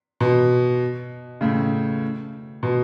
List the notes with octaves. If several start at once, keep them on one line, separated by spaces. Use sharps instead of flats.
B2
A2 C#3
B2